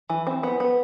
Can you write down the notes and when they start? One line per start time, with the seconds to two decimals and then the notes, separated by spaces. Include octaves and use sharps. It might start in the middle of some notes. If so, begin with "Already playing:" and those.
0.10 E3
0.27 C4
0.43 B3
0.60 B3